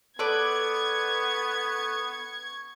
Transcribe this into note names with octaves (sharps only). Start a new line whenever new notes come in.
B3 A4 B4 D5 C#6 G#6